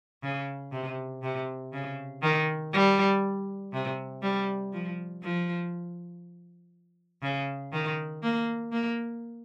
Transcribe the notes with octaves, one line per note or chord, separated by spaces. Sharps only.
C#3
C3
C3
C#3
D#3
G3
C3
G3
F3
F3
C#3
D#3
A#3
A#3